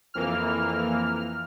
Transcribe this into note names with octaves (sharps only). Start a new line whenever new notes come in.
F2 E3 A#3 F6